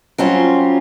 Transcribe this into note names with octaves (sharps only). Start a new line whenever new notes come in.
F#3 G3 C4 C#4 F4